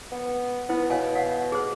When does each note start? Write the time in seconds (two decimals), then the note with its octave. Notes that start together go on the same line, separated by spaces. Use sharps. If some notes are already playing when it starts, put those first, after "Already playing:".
0.12 B3
0.69 B3 E4 C5
0.90 B2 C#5 F5 G#5
1.15 F5 F#5
1.52 G#4 C5